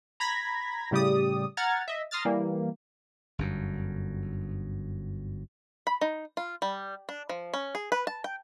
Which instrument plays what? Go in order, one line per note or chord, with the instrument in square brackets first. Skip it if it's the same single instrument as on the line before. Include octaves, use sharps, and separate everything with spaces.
[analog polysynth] A#5 B5 G#6 A#6 B6
A2 C#3 G3 G4 D5 D#6
F#5 A#5 F6 G#6 A6
D#5 E5
A#5 C6 D#6 F6 A6
E3 G3 A#3
[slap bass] G1 F#2
[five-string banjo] B5
D#4
F4
G3
D4
F3
C#4
G#4
B4
A5
G5